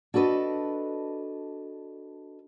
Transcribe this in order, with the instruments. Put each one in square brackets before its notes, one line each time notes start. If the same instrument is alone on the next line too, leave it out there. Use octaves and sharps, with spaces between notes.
[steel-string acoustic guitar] D4 F#4 A4 B4 D#5